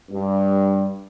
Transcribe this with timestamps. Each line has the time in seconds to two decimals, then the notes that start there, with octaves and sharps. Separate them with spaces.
0.11 G2